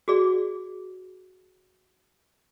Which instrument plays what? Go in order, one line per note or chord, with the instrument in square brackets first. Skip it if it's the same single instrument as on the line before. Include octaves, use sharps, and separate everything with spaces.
[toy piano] F#4 G#4 D5